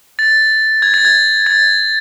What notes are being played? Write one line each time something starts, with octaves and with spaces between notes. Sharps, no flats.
A6
G#6
A6
G#6
A6